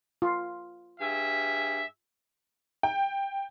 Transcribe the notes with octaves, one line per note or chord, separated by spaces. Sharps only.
F4
G2 G#4 E5
G5